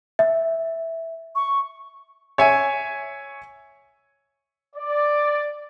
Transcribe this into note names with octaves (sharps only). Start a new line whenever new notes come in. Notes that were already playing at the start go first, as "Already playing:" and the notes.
E5
C#6
C#5 E5 G#5
D5